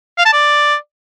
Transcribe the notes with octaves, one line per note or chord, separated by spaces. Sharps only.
F5
A5
D5